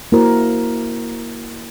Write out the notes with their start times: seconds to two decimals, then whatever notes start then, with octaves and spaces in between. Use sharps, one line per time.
0.12 A#3 E4 F#4 A#4 C5